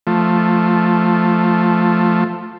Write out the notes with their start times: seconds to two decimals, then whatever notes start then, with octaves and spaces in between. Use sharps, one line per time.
0.07 F3 A3